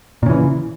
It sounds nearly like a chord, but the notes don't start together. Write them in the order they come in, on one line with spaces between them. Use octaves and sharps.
A#2 C#3 E3